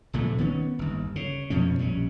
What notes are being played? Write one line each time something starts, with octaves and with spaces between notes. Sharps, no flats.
F1 D2 A#2 A3
D#3 B3 C#4
G1 D#2
C#3
F2 B2 F3 C#4
A#1 G3 C#4